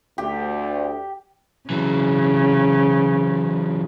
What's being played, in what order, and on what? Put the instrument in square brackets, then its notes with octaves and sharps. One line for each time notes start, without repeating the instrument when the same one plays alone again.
[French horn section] D2 [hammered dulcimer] G4
[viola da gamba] C#3 [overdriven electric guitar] E3 F#3